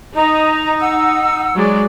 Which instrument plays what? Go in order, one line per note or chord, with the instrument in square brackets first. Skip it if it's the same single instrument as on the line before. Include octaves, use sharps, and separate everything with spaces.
[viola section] D#4 [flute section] D#5 A#5
[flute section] F#5 E6
[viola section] F#3 G#3 D5